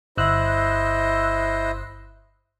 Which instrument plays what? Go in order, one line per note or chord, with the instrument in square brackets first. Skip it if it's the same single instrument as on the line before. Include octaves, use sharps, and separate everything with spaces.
[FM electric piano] G1 E6 F#6 [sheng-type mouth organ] E4 C5 D#5